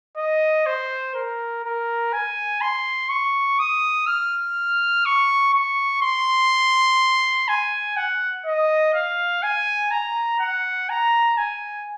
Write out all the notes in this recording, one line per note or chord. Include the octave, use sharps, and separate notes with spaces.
D#5
C5
A#4
A#4
G#5
C6
C#6
D#6
F6
C#6
C#6
C6
G#5
F#5
D#5
F5
G#5
A#5
F#5
A#5
G#5